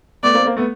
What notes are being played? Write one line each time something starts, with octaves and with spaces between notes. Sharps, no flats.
A3 B3 D5
A#3 C4
A#3 C4
A3 B3